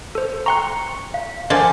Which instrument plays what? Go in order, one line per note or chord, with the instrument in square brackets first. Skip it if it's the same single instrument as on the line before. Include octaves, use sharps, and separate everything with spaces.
[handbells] A4 C5
[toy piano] G5 C#6 [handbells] A#5 C6 F#6
[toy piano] F5
[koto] D3 F3 [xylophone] A#4 G#5 [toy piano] D#5 [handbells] C6 G#6 A6